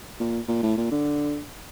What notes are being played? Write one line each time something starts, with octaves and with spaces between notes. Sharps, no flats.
A#2
A#2
A2
A#2
D3